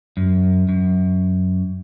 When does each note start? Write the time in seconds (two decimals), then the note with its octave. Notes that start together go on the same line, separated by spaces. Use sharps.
0.17 F#2
0.69 F#2